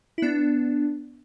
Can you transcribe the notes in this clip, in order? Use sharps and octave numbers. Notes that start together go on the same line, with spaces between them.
E4
B3 D4